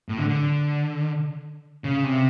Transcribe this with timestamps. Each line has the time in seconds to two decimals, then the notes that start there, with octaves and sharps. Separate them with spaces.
0.09 A2
0.18 D3
0.29 D3
1.84 C#3
2.04 C3